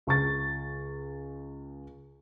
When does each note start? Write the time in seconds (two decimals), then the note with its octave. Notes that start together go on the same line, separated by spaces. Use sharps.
0.07 C#2 C#6 A6